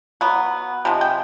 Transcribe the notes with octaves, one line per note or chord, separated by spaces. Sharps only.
F#3 B3
C3 F3 G#3
G5